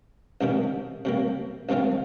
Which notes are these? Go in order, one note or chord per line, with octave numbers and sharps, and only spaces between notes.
C2 C3 D#3 G3
C3 G3 A#3
C2 C3 D#3 C4 F4